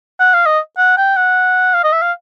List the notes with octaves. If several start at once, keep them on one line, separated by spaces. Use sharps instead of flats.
F#5
F5
D#5
F#5
G5
F#5
F5
D#5
E5
F5